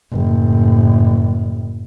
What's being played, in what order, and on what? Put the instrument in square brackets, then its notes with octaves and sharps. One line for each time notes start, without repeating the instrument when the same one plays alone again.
[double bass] F#1 A2